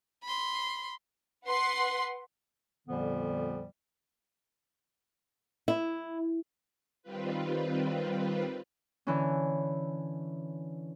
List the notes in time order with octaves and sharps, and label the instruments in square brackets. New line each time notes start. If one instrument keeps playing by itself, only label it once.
[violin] B5 C6
[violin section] B4 F#5 C6
[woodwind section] F2 A#2 D3 F3 G3 B3
[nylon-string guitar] E4
[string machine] D#3 G3 C4 F4 B4
[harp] D3 E3 C#4